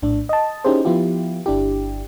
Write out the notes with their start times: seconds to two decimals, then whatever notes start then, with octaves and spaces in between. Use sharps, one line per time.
0.02 A#1 A2 D4
0.29 D#5 A5
0.65 C#4 D#4 E4 G4 G#4 C5
0.85 F3 B3 E4 F4 G4
1.46 G1 D4 E4 G4